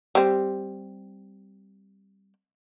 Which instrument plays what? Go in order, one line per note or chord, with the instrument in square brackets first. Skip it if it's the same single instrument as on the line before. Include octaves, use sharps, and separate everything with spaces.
[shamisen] G3 C4